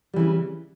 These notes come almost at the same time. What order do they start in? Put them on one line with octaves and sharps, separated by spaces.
G3 E3 C#3